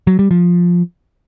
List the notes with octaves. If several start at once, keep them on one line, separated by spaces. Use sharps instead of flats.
F#3
G3
F3